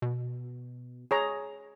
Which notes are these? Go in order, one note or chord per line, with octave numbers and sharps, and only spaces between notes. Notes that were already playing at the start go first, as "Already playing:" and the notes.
B2
G#4 C#5 A#5